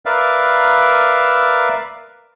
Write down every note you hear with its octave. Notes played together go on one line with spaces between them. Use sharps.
A#4 B4 D5 E5 F5